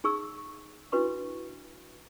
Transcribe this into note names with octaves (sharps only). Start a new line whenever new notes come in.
D#4 G#4 C#6 E6
D4 E4 F#4 B4 C6 C#6